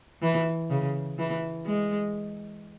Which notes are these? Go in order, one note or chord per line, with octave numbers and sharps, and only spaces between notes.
E3
C#3
E3
G#3